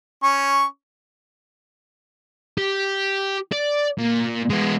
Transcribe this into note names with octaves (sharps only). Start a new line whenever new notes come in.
C#4 C#6
G4
D5
A#2
G#3 B3